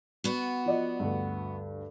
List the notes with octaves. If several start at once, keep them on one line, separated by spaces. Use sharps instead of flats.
B3 F#4
F3 D5 D#5
D2 G2